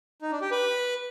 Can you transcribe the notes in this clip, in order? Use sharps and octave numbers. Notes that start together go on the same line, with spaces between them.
D#4
D4
G4
B4